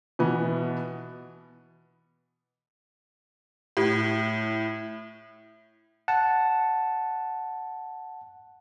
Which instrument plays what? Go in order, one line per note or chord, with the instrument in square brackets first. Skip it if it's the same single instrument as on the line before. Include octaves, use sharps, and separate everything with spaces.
[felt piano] B2 E3 B3
[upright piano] A2
[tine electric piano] F#5 A5